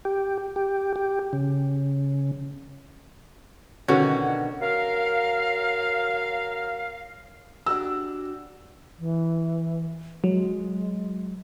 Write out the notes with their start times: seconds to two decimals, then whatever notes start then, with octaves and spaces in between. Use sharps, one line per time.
0.05 G4
0.56 G4
0.96 G4
1.33 C#3
3.88 B2 D3 D#3 C#4 F#4
4.61 F#3 A#4 F5
7.66 D4 F#4 G4 E6
8.99 E3
10.24 F#3 G#3